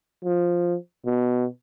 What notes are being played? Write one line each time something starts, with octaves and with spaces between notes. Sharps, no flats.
F3
B2